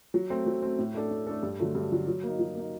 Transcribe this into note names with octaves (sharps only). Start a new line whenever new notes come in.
F#3
A3 C4
F#3
A3 C4
A2
A3 D4 A4
A2
A3 D4 A4
G2
D3 F#3 A3
G2
D3 F#3 A3
F#3
A#3 D#4
F#3
A#3 D#4